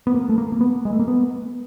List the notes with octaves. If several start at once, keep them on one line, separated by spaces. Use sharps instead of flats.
B3
A#3
A3
A#3
A#3
B3
G#3
A3
A#3
B3